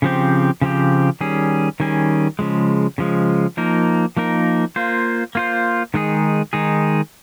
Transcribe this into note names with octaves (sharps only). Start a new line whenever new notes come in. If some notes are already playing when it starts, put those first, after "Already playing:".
C#3 F3 C4 G4
C#3 F3 C4 G4
D#3 G3 C#4 G#4
D#3 G3 C#4 G#4
C#3 F3 G#3
C#3 F3 G#3
F3 A#3 D#4 A#4
F3 A#3 D#4 A#4
A#3 F4 C5
A#3 F4 C5
D#3 G#3 D#4 G#4
D#3 G#3 D#4 G#4